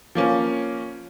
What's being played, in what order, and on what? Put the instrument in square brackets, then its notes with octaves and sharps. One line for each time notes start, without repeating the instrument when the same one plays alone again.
[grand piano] F3 A#3 C#4